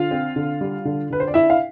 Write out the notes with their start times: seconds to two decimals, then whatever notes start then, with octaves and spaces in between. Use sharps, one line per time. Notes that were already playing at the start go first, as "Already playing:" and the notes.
Already playing: D3 F4 F5
0.11 C4
0.36 D3
0.61 G3
0.85 D3
1.10 D3 B4
1.20 C5
1.28 D5
1.34 D4 E4 E5
1.50 F5